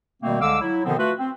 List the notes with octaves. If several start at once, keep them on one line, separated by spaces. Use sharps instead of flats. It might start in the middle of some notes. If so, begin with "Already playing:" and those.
B2 D#3 G3 A3 A#3 C4
C2 D3 G#3 F5 D6 E6
F#3 E4
B2 D3 D#3 F3 B3 C4
A3 F4 F#4 B4
C4